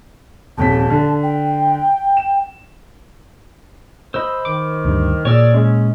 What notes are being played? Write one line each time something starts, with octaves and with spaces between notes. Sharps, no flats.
D#1 F2 A5 B6
D3
G5
E7
C5 D#5 B5 E6
D#3 D6
D2 G2
A#2 G#4 A#4 C#5 D5 E6
G#3 C#4